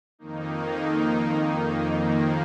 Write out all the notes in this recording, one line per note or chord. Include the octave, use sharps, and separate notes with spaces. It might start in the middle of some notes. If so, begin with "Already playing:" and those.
F2 D#3 A#3 D#4
F2 D#3 A#3